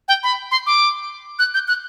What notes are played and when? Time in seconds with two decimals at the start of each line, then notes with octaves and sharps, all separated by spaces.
0.08 G5
0.23 B5
0.51 C6
0.67 D6
1.39 F#6
1.54 G6
1.68 F#6